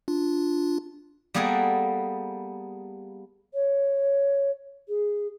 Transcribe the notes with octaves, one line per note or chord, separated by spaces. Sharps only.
D4 F4
G3 A#3 B3 G#4 A4 F#5
C#5
G#4